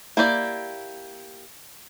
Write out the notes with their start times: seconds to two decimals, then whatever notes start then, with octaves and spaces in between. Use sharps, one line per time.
0.17 A#3 E4 G4 D5